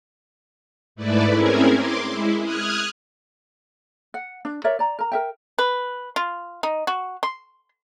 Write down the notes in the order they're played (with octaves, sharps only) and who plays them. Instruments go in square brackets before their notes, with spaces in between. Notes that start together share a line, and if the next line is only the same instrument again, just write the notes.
[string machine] G#2 A3 E4 B4 D5
C4 C#4 E4 G#4 A#4 G#5
C6 D6
G#3 E4
D#6 F6 F#6 G#6
[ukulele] F#5
D4
A#4 C#5 D5 E5
D5 A#5
A#4 A#5
A#4 E5 G5
[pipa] B4
F4
D#4
F#4
C6